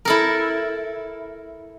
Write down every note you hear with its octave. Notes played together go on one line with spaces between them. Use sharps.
E4 A4 A#4